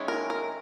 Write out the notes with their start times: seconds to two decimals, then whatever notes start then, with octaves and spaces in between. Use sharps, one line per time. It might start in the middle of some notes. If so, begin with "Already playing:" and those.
Already playing: D#3 G#3 C#4 E4
0.08 A#4
0.30 A#4